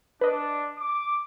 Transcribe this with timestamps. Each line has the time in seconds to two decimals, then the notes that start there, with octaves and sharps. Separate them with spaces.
0.21 D4 B4 D#5
0.78 D6